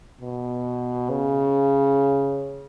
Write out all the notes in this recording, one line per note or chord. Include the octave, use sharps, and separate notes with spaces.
B2
C#3